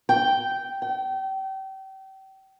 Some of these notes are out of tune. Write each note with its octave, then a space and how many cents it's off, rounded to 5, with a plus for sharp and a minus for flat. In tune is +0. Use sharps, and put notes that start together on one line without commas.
G5 -10
G5 -30